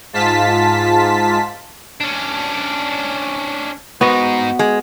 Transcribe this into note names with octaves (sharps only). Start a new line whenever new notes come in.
G#2 F4 A5 B6
C#4 D4
G#2 B3 D#4 F#4 D#5
G#3